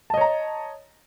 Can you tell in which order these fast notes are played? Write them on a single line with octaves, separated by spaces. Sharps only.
A5 D#5 C#5 A#5